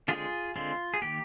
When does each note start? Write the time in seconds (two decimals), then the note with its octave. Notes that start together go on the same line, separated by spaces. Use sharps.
0.08 D3 G#3 C4 F4 G#4
0.56 D3 G#3 C4 F4
0.94 G#4
1.02 D#3 A#3 G4